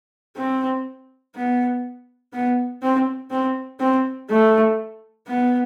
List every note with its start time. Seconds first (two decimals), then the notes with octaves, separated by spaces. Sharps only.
0.37 C4
1.35 B3
2.33 B3
2.83 C4
3.31 C4
3.80 C4
4.30 A3
5.28 B3